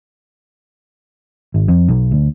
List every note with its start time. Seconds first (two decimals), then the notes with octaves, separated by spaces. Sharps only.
1.54 G#1
1.68 F2
1.89 B1
2.11 D2